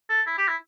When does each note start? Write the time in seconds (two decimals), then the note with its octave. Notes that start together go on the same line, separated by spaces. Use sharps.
0.09 A4
0.26 E4
0.38 G4
0.48 E4